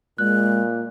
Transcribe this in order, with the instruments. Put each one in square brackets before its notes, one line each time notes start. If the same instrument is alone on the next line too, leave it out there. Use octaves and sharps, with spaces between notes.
[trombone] A#2 [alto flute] G#3 [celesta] F#6